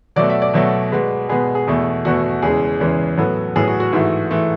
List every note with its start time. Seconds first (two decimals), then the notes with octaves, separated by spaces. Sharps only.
0.16 B2 F#3 A3 D5
0.29 E5
0.42 D5
0.54 B2 F#3 A3
0.92 B2 G#3 B3
1.29 B2 G#3 B3 G#4
1.55 G#4
1.67 E2 B2 A3
2.05 E2 B2 A3 F#4
2.42 E2 C#3 E3 G#3 G#4
2.80 E2 C#3 E3 G#3
3.18 A2 F#3 B3 A4
3.56 A2 F#3 B3 G#4
3.68 F#4
3.80 F#4
3.93 G#2 E3 A3
4.31 E3 A3